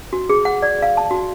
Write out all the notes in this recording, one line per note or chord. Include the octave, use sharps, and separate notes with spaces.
F#4
G#4
F#5
D5
F5
A5
F#4